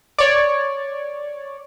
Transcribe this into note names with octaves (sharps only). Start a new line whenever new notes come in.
C#5 D5